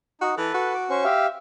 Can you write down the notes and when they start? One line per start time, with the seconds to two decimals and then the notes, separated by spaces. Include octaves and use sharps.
0.21 D#4 F#4
0.37 E3 A4 B4
0.54 F#4
0.74 D6
0.90 C#4 C5 C#6
1.04 G4 E5 F5